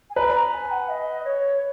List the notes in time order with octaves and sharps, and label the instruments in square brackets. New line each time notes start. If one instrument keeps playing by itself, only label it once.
[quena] G#5
[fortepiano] B4 [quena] A#5
[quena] A#5
G#5
F#5
D#5
C#5